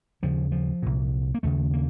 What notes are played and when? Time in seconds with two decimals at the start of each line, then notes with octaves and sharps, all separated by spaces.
0.23 D#2 C#3 F3
0.52 F3
0.82 C2 A#2
1.35 A#3
1.43 D#2 C#3 A3
1.73 A#3